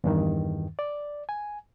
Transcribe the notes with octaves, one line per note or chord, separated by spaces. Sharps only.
E2 G2 D#3
D5
G#5